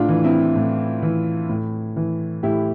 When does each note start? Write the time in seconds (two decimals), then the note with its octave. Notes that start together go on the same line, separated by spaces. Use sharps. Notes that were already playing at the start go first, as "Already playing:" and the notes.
Already playing: A2 D4 F4
0.09 E3
0.24 C4 E4
0.56 A2
1.03 E3
1.49 A2
1.96 E3
2.43 A2 E4 G4